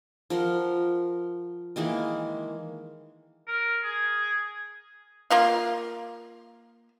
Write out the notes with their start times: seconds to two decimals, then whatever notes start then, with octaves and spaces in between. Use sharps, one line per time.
0.30 F3 A#4 F#5 C6
1.76 D#3 E3 G#3 A#3
3.48 A#4
3.84 G#4
5.30 A#3 F4 F5